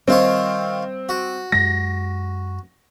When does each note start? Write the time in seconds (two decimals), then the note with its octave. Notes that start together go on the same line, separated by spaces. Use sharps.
0.08 D#3 G3 C4 F4 C#5
1.09 F#4
1.52 F#2 G#3 A#6